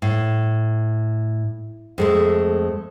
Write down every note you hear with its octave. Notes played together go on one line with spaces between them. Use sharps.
A2
F2 G#3 A3